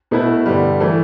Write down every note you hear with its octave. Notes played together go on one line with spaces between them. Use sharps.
B2 A3 E4 B4
G2 D3 G3
E3 A3